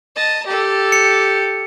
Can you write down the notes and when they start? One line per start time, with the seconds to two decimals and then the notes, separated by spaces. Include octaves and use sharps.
0.15 D#5 A5
0.46 G4 A4
0.92 C#7